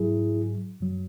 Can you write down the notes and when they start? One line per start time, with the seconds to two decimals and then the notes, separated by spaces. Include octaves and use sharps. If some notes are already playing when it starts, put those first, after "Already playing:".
Already playing: G#2 F#3 E4 G#4
0.80 F#2 F#3